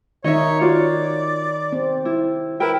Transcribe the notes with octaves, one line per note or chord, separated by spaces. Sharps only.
D#3 D#4 C#5 D#5 E5
F4 F#4 C#5 D5
C4
E4
E4 A#4 B4 G5